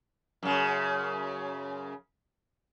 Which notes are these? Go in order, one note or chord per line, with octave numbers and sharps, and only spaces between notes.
F#2 C#3